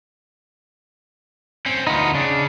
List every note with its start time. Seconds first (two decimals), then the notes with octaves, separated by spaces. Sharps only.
1.66 C4 C#4
1.87 D2 B3 D#4 F4
2.15 C#3 D4